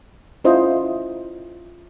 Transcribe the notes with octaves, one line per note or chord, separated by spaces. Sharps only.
C#4 E4 F4 C5 D#5